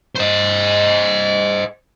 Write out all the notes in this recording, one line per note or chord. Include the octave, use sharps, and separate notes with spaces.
C5 D#5